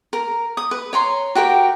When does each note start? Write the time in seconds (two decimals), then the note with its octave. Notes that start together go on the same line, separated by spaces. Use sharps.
0.13 A#4
0.57 D#6
0.71 B4
0.93 C#5 A#5 C6
1.35 F#4 G4 A#4 G5